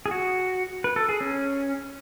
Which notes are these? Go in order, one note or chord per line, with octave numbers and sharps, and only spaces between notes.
G#4
F#4
B4
A4
G#4
C#4